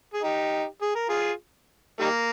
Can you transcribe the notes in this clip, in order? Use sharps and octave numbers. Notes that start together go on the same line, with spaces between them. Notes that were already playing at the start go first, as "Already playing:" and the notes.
G#4
D#4 G4
G#4
A#4
F4 G#4
D#3 G3 A#3